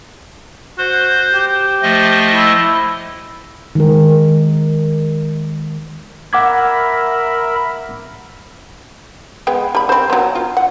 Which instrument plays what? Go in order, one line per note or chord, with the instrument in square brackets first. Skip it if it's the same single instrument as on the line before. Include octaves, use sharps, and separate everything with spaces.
[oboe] F#4 [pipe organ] C5
[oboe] G4
[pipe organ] F3 A3 D#5
[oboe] E4
[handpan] D#3 G#3 A#4
[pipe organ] A#4 E5 B5 [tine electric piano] F#5 D6 G#6
[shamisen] G#3 B3 G5
G3 B5
C4 C5
F#3 B3
F4
F#5